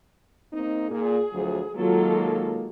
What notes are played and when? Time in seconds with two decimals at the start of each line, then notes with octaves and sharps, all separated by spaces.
0.53 A#3 C4 D#4
0.90 A#2 G#4
1.32 D2 F3 F#3
1.76 D#3 F#3 G#3 A#3 F4 A4